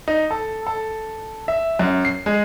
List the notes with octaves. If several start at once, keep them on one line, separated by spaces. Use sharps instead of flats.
D#4
A4
A4
E5
F#2
C7
G#3